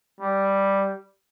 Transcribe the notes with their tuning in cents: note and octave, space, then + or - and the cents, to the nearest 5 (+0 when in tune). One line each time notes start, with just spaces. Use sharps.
G3 +0